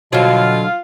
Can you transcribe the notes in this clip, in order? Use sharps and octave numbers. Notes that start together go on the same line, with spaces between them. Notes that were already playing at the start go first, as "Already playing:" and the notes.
B2 D3 F#3 F4 F5